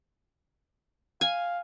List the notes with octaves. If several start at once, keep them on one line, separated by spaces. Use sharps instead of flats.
F5 G#5